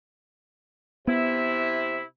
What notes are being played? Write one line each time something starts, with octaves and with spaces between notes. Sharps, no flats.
C3 B3 E4